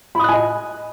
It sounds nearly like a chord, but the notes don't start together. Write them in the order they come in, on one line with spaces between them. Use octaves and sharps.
B5 D#6 F#6 G#5 D#5